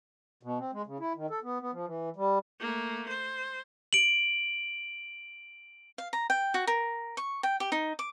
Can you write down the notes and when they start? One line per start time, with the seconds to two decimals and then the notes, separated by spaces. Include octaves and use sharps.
0.43 B2
0.59 C4
0.73 G#3
0.87 C#3
1.00 E4
1.15 D#3
1.30 A4
1.43 B3
1.61 B3
1.72 F3
1.86 E3
2.16 G3
2.60 A3 A#3
3.08 C5
3.93 D7 F#7
5.98 F5
6.13 A#5
6.30 G5
6.54 F#4
6.67 A#4
7.17 C#6
7.43 G5
7.60 G4
7.72 D#4
7.99 D6